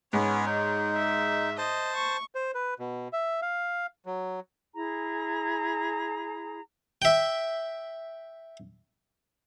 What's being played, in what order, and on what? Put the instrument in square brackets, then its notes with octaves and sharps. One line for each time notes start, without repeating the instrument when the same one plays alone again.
[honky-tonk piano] G#2 [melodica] B3 C#4 [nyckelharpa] C#5
[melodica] D#4
[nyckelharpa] E5
[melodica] C5 A5 [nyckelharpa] D#5
[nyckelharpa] C#6
[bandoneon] C5
B4
B2
E5
F5
F#3
[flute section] E4 G#4 A#5
[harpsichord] E5 G5